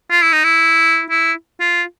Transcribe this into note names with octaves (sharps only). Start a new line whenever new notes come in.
F4
E4
D#4
E4
E4
F4